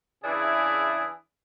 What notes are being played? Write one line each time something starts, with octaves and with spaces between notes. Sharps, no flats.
C#3 E3 D4 E4 G#4